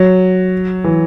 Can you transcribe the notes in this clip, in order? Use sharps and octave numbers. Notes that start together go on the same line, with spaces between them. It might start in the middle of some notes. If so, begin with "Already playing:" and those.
Already playing: F#3
E3